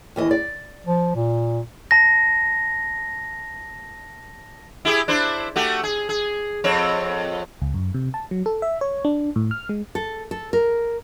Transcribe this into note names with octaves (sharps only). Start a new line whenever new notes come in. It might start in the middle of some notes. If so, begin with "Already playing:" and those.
D#2 E3 D#5
D5
F3
A#2
A5 A#6
E4 G4 G#4
D4 E4 C5
A3 F#4 G4
G#4
G#4
F2 C4 C#5
C#2
F#2
C3
A5
F#3
A4
E5
C#5
D4
A2
F6
G#3
A4
A4
A#4